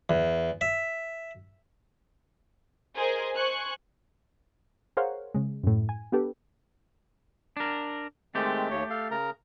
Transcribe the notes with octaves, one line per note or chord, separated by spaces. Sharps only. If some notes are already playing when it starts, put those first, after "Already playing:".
E2
E5
G#4 A#4 C5 D#5 G#5
C5 G#5 C#6 F#6
G#4 A#4 C5 C#5 F5 F#5
C#3 G#3
F#2 A2
G#5
B3 D4 G4 A4 B4
D4 A#4
D#3 G#3 A3 C4 G4
D#2 C#5
A4 F5
C#3 A#4 A#5